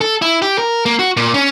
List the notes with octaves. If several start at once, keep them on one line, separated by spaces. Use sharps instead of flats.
A4
E4
G4
A#4
A#3
F#4
A#2
C#4